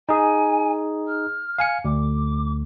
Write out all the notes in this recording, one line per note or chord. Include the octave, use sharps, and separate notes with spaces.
D#4 G#4 G#5
F6
F5 G#5 C#7
D2 D6